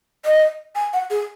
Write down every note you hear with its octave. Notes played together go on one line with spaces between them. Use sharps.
D#5
G#5
F#5
G#4